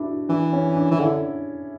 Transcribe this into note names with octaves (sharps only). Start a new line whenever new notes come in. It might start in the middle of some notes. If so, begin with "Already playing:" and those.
Already playing: D4 E4 F#4
E3 D4
C#4
D4
E3
D3 E4